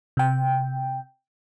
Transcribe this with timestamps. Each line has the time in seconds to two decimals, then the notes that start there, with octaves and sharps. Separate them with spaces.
0.17 C3 G5